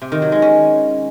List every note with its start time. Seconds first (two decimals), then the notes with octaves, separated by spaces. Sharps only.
0.02 C3
0.12 D#3
0.22 F#3
0.32 G#3
0.42 C#4